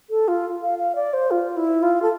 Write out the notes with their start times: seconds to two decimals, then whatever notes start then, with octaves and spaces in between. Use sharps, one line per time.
0.10 A4
0.28 F4
0.62 F5
0.78 F5
0.96 D5
1.13 C5
1.31 F4
1.57 E4
1.83 F4
2.02 A4